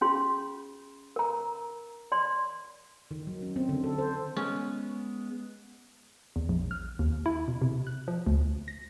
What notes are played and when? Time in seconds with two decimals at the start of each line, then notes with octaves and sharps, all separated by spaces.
0.01 C#4 F4 G#4 C6
1.16 A#4 A#5
2.12 D5 C6
3.11 D#3
3.27 F#3
3.42 C#4
3.56 C4
3.69 D3
3.84 A4
3.98 C5
4.37 G#3 B3 C#4
6.36 E2
6.49 A#1
6.71 F6
6.99 D#2
7.26 E4
7.48 B2
7.61 C3
7.87 F#6
8.08 F3
8.26 D2
8.68 A#6